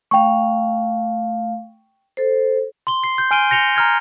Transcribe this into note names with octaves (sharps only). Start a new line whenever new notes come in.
A3 F5 G5 C#6
A4 C5
C6 G7
C7
G6
G#5 F6 D7 D#7 G7
G6 A#6 C#7 F7 G7
A#5 F6 G#6